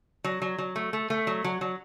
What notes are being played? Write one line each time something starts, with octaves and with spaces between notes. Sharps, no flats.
F#3
F#3
F#3
A3
A3
A3
F#3
F#3
F#3